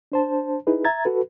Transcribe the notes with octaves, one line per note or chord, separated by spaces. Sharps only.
D4 C5 A5
D#4 E4 G#4 B4
E5 A#5 G#6 A6
F#4 A4 B4